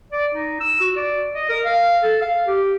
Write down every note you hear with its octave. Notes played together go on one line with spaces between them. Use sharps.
D5
D#4
E6
F#4
D5
D#5
A#4
F5
A4
F5
G4